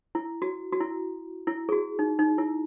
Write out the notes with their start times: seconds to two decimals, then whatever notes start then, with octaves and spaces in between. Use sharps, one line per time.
0.15 E4
0.42 F#4
0.73 F#4
0.80 E4
1.47 E4
1.69 G#4
1.72 F#4
1.99 D#4
2.19 D#4
2.38 E4